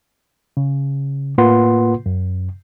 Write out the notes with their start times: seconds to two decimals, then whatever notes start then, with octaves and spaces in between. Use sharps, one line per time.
0.57 C#3
1.38 A2 A#3 F4 B4 F#5 C6
2.06 F#2